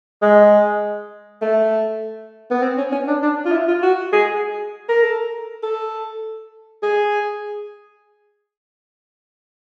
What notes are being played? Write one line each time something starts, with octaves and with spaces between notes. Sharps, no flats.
G#3
A3
B3
C4
C#4
C#4
D4
D4
F4
E4
F4
F#4
G#4
A#4
A4
A4
G#4